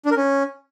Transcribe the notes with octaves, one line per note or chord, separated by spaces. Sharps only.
D4
A#4
C#4